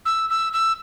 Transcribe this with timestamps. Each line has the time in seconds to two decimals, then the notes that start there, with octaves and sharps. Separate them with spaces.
0.05 E6
0.30 E6
0.53 E6